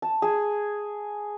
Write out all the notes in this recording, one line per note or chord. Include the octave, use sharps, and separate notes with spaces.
A5
G#4